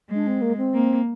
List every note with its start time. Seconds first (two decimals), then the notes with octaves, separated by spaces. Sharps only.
0.09 G#3
0.15 D4
0.27 C4
0.42 A#3
0.57 C4
0.73 A#3